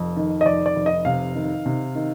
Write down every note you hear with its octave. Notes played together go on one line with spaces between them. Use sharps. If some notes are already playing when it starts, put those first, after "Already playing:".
Already playing: F1 F2
D#3
D#5
F1 D5
D5
F1
D#5
C3 F5
D#3
C3
D#3